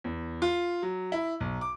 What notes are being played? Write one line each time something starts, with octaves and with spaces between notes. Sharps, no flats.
E2
F4
F#3
E4
B1
D6